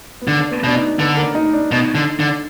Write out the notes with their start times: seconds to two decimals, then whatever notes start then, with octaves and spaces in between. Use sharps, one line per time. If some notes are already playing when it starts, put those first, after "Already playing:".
0.22 B3
0.27 D3 D4
0.51 B3
0.64 B2 D4
0.75 D#4
0.99 D3 B4
1.17 A#4
1.35 D#4
1.53 D4
1.71 B2 D#4
1.95 D3
2.20 D3